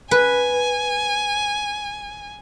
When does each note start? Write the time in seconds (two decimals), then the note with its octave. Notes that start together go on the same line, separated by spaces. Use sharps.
0.11 B4 G#5